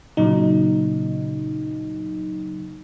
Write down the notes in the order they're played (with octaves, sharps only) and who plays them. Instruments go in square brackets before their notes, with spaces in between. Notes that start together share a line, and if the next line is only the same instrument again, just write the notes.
[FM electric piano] A#2 C#3 F#3 D#4